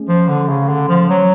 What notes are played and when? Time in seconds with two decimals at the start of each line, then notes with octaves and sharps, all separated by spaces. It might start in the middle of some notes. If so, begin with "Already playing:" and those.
Already playing: A3 C#4 G#4
0.09 F3
0.29 D3
0.49 C#3
0.69 D3
0.89 F3
1.10 F#3